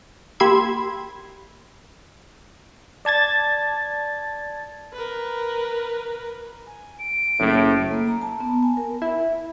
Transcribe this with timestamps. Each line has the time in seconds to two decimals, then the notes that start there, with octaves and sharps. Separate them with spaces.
0.40 A#3 G4 B5 C6 E6 G#6
3.05 D5 A5 G#6 A6
4.93 A#4 B4
6.67 G#5
6.99 D7
7.40 F#1 A2
7.91 A#3
8.07 A#5
8.22 A5
8.40 B3
8.63 G#5
8.77 A#4
9.02 E4